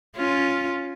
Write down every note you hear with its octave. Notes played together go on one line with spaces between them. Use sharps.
C#4 F4